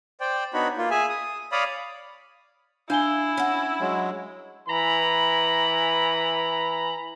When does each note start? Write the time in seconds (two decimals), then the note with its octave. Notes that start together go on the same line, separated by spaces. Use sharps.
0.20 C5 D5 G5
0.54 B3 D4 D#4 F#4 C#5 B5
0.77 A#3 F4
0.91 G#4 E5 G#5
1.09 D#6
1.52 C#5 D5 F5 B5 D#6
2.90 D4 E4 F5 G#5 G7
3.38 C#4 F#4
3.81 F#3 G#3
4.67 E3 A#5 B5